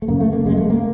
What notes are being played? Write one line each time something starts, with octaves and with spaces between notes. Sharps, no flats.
A3
F#2 C#3 A#3
A3
A#3
F#2 C#3 G#3
A3
A#3